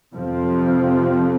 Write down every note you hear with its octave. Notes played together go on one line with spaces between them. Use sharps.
F2 C3 F3 C4